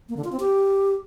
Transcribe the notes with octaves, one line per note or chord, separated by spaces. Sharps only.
A#3
D3
F4
C4
G4